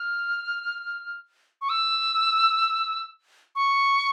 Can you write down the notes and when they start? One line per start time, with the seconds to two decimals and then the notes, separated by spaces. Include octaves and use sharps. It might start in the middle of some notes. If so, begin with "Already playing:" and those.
Already playing: F6
1.61 C#6
1.69 E6
3.55 C#6